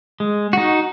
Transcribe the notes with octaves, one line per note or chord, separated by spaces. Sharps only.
G#3
D#4 F#4